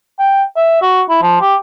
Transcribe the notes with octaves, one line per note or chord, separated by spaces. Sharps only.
G5
E5
F#4
E4
F3
G4